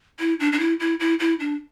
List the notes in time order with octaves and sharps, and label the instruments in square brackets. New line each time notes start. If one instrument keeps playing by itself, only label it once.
[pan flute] E4
D4
D4
E4
E4
E4
E4
D4